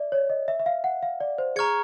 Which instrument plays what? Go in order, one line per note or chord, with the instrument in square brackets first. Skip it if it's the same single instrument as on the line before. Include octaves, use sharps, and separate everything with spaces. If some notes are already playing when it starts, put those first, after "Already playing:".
Already playing: [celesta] D5 E5
C#5
D#5
E5
E5
F5
F#5
F5
D5
C5
[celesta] G#4 [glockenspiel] A#5 C#6 F6 G#6 C#7